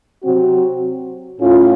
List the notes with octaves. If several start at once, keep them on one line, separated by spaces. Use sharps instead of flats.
C3 F#3 C4 F#4
A2 A3 C#4 F4